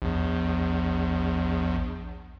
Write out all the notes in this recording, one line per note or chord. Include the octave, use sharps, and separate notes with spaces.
A#1 E2